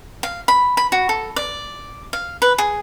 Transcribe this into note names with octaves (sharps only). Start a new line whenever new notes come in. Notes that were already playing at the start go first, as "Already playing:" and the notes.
F5
B5
B5
F#4
A4
D5
F5
B4
G#4